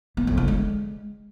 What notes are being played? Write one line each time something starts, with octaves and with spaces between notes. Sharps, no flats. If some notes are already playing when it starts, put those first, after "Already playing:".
B3
F2
D3
G#3